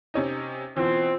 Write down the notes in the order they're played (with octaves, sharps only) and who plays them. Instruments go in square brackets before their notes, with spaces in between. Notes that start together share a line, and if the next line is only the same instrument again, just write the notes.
[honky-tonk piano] C3 C#4 D#4
[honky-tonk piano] B2 E3 [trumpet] C4 [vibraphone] F4